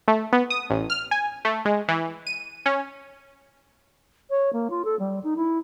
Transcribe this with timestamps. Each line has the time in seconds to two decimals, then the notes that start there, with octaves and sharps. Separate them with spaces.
0.08 A3
0.33 B3
0.50 D#6
0.70 A1
0.90 F6
1.11 G#5
1.45 A3
1.65 G#3
1.88 E3
2.27 D#7
2.66 C#4
4.30 C#5
4.52 A#3
4.70 F4
4.84 A4
4.99 G3
5.23 D#4
5.36 E4